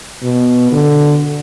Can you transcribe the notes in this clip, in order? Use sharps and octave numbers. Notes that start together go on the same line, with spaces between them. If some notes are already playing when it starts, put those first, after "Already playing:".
B2
D3